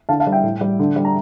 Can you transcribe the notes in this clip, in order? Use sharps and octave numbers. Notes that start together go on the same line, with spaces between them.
D3 F5 A5
F5 A5
G3
E5 G5
A2
G3
D3
G3
A#5